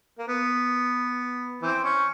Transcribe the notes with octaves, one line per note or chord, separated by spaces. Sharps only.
A#3
B3
E3 C4
C#4